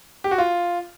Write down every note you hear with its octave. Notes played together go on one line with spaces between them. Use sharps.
G4
F#4
F4